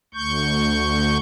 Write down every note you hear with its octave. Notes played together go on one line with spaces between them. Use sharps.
D2 C#6 G6